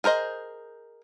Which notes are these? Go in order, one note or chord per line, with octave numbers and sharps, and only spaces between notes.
G#4 A#4 C5 D#5